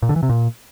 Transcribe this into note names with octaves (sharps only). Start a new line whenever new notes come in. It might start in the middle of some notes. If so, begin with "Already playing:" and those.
A#2
D3
E3
C3
A#2